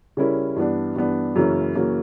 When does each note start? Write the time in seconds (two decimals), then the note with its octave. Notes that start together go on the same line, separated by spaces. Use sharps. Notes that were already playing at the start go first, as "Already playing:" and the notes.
0.17 C#3 G3 C#4 E4 A#4
0.56 G2 E3 B3 D4
0.96 G2 E3 B3 D4
1.36 F#2 C#3 E3 A#3 C#4
1.75 F#2 C#3 E3 A#3 C#4